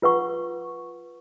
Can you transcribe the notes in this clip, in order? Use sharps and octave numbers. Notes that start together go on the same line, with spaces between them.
F4 B4 F#5 C#6